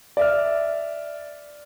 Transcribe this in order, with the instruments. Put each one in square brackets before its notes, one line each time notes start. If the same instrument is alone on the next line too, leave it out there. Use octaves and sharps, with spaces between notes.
[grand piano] D5 E5 F6